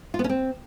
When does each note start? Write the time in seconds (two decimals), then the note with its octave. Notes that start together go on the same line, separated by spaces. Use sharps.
0.14 F4
0.19 B3
0.24 C#4
0.29 C4